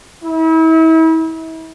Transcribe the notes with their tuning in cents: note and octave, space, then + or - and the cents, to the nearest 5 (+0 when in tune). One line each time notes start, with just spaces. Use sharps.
E4 -35